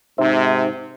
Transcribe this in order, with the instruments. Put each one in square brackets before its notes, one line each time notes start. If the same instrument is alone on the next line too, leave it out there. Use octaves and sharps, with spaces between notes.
[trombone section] G#2 C3 [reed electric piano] D#4 C5 E5